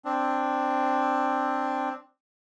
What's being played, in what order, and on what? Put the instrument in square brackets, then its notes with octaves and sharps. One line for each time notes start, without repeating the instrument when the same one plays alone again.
[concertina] C4 D4